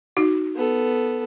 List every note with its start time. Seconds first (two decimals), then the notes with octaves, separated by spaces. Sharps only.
0.17 D#4 F#4
0.55 B3 A4